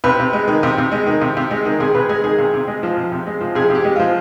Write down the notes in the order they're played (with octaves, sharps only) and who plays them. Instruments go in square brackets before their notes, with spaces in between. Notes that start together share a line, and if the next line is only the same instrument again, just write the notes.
[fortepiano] C3 B4
C3
G#3
D#3
C3
C3
G#3
D#3
C3
C3
G#3
D#3
C3 G#4
C3 B4
G#3 G#4
D#3 G#4
C3
C3
G#3
F3
C3
C3
G#3
F3
C3 G#4
C3 G4
G#3
F3 F4